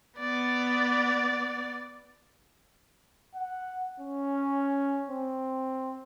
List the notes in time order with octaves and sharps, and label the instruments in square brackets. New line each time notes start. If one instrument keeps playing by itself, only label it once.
[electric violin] B3 D5
[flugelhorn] F#5
C#4
C4